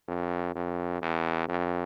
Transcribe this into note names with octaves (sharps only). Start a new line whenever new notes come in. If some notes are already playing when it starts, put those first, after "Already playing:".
F2
F2
E2
F2